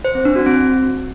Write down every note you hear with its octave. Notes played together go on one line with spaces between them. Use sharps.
C5
C4
D4
F#4
C4